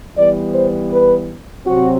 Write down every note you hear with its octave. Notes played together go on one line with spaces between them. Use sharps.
E3 G3 B3 D5
C5
B4
C3 F#3 C4 F#4